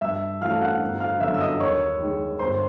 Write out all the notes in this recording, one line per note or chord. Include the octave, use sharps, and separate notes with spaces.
G2 E5 E6
E3 A3 C#4 F#4 F5 F6
F#5 F#6
G1
F5 F6
F#2 D3 F#3 B3 E5 E6
E6
D#5 D#6
D#2 C#5 C#6
D#3 G#3
G1 C5 C6